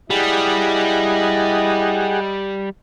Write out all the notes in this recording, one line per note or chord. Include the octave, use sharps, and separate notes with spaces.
G3 E4 G4 G#4 D#5 F#5